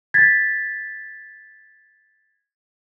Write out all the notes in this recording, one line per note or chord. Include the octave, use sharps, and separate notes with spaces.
G#6 A6 B6